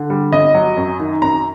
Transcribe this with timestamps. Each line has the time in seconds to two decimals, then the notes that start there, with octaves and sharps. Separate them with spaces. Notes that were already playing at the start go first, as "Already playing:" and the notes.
Already playing: D3
0.10 G3
0.32 G1 D#5
0.55 F#3
0.77 F#2
1.00 D#3
1.22 F#2 A#5